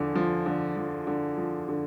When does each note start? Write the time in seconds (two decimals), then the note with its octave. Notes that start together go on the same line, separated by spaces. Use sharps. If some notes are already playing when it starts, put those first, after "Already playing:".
Already playing: E2 D3 F3
0.15 F3
0.46 D3
0.76 F3
1.07 D3
1.38 F3
1.69 D3